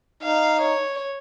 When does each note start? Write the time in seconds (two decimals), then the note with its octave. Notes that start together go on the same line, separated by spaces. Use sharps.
0.23 D#4 F5
0.61 C#5